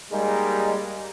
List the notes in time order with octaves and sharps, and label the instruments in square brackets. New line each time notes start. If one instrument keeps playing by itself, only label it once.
[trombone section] G3 G#3 A#3 D#4